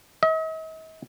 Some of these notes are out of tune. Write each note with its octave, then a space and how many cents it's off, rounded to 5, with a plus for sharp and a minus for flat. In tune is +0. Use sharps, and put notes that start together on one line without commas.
D#5 +45